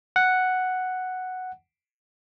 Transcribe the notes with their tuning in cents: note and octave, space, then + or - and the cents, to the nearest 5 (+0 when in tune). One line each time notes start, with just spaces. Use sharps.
F#5 +0